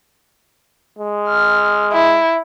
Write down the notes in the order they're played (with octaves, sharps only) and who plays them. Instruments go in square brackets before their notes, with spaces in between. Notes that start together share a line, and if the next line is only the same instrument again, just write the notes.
[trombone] G#3
[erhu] F6
E4